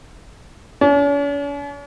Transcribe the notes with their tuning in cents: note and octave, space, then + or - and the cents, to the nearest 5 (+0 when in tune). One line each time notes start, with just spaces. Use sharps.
C#4 +45